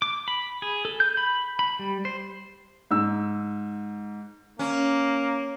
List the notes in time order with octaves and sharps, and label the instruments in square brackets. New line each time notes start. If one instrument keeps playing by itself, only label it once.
[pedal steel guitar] D6
B5
G#4
A4
G6
B5
B5
G3
C5
[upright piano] G#2 E6
[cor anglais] A#3 [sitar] C#4